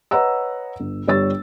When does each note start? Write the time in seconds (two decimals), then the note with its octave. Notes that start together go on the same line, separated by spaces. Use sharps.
0.11 B4 C#5 D#5 F#5 A#5 E6
0.80 G1
1.07 G1 G3 C#5 E6 A6